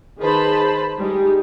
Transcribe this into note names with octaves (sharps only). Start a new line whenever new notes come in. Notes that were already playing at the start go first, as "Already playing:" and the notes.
D#3 G#4 B4 C5 A5 B5
G3 G#3 D#4 G4